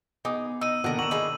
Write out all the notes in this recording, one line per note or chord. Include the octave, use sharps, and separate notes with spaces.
B3 D#4 G#4 D6 D#6
D#4 E6 D#7
B2 D3 D#3 A#3 A#4 F#5
C#6 E7 F#7
D#4 E4 G#4